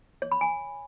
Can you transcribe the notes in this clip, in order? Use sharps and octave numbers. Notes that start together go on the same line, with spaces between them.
C#5
B5
G#5